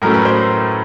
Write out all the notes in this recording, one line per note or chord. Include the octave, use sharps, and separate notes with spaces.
A2 F#3 A3 C#4 A#4
B4
C5